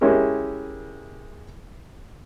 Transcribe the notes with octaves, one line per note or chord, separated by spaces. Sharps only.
G#3 C#4 E4 G4 A#4